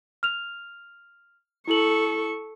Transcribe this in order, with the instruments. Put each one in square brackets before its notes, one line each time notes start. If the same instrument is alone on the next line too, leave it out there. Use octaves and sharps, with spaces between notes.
[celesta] F6 F7
[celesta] E4 F#7 [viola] A4 C#6